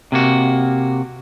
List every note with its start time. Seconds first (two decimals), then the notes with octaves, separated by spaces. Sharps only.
0.12 C3 A#3 F#4